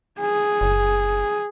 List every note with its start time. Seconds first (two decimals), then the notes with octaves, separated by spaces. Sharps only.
0.19 G#4
0.61 F#1